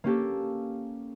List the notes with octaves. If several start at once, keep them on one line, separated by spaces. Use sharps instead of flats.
A#3 C#4 G4 A4